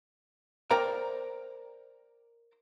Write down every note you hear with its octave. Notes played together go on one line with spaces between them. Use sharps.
A#4 C5 D5 G5 A#5